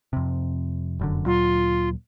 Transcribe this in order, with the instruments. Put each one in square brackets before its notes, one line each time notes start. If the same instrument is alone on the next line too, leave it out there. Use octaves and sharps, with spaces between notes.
[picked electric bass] F2 C3
F1 F#2 D3
[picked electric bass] D2 A#2 F#3 [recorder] F4